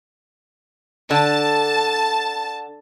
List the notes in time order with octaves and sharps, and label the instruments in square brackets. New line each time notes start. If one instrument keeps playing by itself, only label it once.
[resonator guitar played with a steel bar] D3 [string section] A5